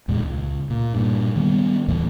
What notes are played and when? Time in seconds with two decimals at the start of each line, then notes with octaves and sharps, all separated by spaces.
0.08 E2 A#2 G#3
0.20 C#2
0.70 A#2
0.95 G2 A#2
1.36 D#3 G3 B3
1.88 D#2 A2 E3 A3